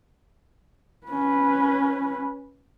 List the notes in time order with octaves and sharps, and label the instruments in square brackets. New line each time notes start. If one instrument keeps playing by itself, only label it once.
[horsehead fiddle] C#4 B4